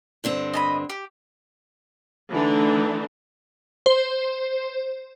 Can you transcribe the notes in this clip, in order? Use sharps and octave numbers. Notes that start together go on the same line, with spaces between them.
G2 D3 C4
D#5 A5 B5
G4
D3 E3 A3 D4 D#4
C5